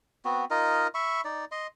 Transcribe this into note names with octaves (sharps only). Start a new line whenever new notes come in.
B3 C4 F#4
D#4 F4 A#4 D#5
E5 B5 C#6
D#4 D5
D#5 C6